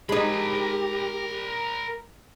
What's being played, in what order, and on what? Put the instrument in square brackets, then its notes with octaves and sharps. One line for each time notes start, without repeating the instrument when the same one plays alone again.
[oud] G#3 D#4 [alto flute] G4 [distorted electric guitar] A#4 B5